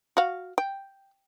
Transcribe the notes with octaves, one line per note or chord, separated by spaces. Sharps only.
F#4 F5
G5